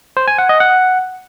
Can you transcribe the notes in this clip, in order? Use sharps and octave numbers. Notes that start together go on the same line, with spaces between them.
C5
G#5
F#5
D#5
F#5